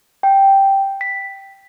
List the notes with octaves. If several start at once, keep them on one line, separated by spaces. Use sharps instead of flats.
G5
B6